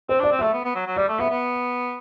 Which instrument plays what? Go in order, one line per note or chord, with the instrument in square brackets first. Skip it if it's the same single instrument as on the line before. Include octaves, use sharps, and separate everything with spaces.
[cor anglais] C4 [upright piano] C5
[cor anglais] D4
[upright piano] D5
[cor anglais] C4
[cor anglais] A3 [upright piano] E5
[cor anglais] B3
B3
F#3
F#3
[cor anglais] G3 [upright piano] D5
[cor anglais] A3
[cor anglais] B3 [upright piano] E5
[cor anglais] B3